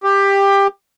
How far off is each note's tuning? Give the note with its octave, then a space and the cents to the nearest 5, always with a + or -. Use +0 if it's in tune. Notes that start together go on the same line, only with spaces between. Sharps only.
G4 +15